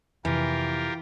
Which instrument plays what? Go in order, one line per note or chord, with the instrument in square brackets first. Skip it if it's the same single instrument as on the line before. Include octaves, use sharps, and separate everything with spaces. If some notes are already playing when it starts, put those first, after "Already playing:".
[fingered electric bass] F2 C3 [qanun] E3 [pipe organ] F4 G4 A#4